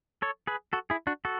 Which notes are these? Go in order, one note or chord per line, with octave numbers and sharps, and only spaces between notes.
A4 C#5
G#4 B4
F#4 A4
E4 G#4
D4 F#4
F#4 A4